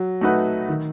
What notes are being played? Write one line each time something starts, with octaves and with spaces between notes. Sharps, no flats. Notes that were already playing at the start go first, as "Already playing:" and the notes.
Already playing: F#3
A3 D#4 F#4 B4
D#3